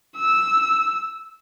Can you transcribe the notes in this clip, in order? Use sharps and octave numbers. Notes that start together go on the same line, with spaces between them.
E6